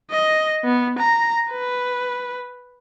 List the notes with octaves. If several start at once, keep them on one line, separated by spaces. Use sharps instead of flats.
D#5
B3
A#5
B4